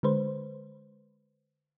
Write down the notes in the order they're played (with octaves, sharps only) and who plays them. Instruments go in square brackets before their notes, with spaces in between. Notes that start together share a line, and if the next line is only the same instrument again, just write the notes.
[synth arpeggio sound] D3 G#3 B4 C5